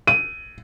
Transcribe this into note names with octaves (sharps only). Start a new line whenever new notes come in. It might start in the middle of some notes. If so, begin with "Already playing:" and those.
D#7